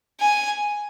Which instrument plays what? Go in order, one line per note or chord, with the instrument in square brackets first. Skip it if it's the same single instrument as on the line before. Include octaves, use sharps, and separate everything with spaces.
[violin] G#5